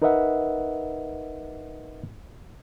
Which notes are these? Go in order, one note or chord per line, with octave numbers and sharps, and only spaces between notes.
D#4 A#4 B4 D#5 E5 F#5